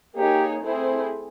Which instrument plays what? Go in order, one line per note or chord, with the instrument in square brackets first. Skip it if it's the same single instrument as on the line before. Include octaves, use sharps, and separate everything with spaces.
[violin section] A#3 D#4 G#4 C#5 [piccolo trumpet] G4
[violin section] A3 C4 E4 G#4 C5